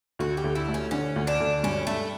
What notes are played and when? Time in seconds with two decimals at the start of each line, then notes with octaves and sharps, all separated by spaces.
0.19 D2 F#4
0.37 G4
0.44 D2
0.55 E4
0.68 A3
0.74 C#4
0.91 D3 C#4
1.16 D2
1.27 D4
1.40 D2
1.63 G2 C#4
1.87 G2 A3